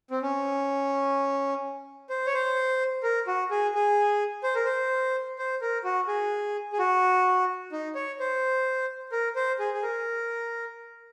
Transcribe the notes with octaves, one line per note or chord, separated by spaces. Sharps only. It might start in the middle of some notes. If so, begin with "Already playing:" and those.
C4
C#4
C5
C#5
C5
A#4
F#4
G#4
G#4
C5
A#4
C5
C5
A#4
F#4
G#4
G#4
F#4
D#4
C#5
C5
A#4
C5
G#4
G#4
A#4